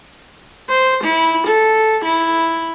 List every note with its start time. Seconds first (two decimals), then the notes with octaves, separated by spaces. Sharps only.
0.69 C5
1.04 E4
1.47 A4
2.05 E4